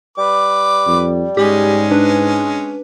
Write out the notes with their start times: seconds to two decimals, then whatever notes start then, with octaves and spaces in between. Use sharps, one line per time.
0.18 G3 B4 D6
0.87 F2
1.37 G#2 G#3 C#4 G4
1.91 D4 B4